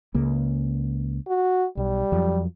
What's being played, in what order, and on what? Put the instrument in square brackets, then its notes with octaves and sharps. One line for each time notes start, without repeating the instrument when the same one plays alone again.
[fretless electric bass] C#2 C#3 A#3
[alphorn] F#4
[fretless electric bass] B1 [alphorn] G3
[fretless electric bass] F2 F3 F#3